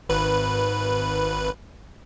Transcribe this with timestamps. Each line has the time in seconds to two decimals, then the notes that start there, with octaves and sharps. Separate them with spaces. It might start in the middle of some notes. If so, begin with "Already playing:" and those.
0.09 G#1 B4